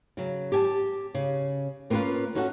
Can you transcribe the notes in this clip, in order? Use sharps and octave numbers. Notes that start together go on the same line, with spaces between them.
C#3 F#3
G4 G#5 A5
C#3
A#3 B3 C#4 F4 A#4 B4
C#4 D#4 F#4 A4 F5 F#5